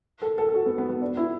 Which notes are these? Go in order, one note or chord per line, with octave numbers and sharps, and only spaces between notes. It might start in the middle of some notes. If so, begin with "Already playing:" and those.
A4
A4
A4
F#4
B3
B3
B3
D4
E4